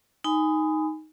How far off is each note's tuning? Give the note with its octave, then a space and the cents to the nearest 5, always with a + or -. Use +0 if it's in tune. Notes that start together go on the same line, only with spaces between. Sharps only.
D#4 +5 G#5 -10 B5 +35